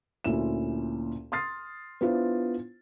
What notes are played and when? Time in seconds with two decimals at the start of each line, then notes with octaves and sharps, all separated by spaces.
0.24 D2 A#2 C#4 E4 E7
1.32 C6 D#6 F6 A6 C7
2.01 B3 D4 E4 F4 C5